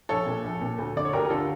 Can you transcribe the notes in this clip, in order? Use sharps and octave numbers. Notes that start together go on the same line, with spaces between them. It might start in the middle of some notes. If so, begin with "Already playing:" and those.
A#1 A4 C#5
A#2
A#1
A#2
D2
D3 D5
C#5
D2 G4 A#4
A#4
D3 F4 A4